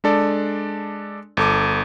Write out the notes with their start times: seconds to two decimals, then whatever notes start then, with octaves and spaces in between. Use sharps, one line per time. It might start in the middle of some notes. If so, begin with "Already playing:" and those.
0.04 G#3 D4 A4 D5
1.37 G1 A4 D6